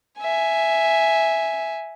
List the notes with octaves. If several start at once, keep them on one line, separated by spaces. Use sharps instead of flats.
E5 G#5